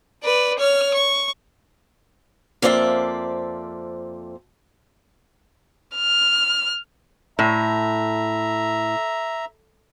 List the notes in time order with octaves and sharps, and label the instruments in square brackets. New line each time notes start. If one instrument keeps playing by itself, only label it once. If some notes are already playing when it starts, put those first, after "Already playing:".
[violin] B4 D5
C#5 F6
C#6
[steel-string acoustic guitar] F2 A#3 C5 D5 E5 A5
[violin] F6
[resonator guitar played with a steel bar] A2 [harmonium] E5 A#5